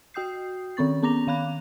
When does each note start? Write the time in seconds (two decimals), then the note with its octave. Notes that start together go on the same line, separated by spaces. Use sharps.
0.14 F#4 G5 D#6 G6 C7
0.77 D#3 C4 C#4 C#6 A6
1.03 B3 C#4 A#5 D6 A#6 F7
1.27 D#3 F5 B5 F#6 F7